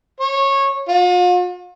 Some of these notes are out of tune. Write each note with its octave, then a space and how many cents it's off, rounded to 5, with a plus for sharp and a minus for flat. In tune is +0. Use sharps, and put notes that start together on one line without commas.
C#5 -15
F4 +45